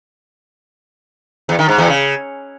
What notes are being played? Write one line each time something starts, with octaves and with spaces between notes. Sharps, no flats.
E2
D#3
G#2
E2
C#3